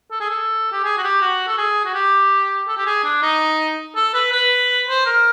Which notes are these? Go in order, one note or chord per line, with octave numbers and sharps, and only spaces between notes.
A4
G#4
A4
G4
G#4
F#4
G4
F#4
A4
G#4
F#4
G4
A4
G4
G#4
D4
D#4
A4
B4
B4
C5
A#4